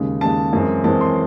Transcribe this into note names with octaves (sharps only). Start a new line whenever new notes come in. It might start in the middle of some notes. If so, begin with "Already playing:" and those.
Already playing: D#2 C#3 G#3
D#2 C#3 G#3 A5
F#2 E3 G#3 C4
F#2 E3 G#3 C4 A5
C6